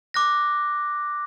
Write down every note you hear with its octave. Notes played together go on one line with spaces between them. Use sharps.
D6 F#6 A#6